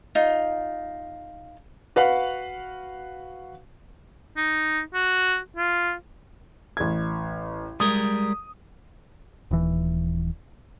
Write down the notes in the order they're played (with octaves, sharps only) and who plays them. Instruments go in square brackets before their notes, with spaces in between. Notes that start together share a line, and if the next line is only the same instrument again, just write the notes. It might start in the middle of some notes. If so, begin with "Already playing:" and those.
[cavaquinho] D#4 F4
[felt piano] F#4 B4 F5 F#5
[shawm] D#4
F#4
F4
[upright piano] A1 G#6
[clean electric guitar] G3 G#3 A#4 [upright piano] D#6
[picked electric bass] D#1 E3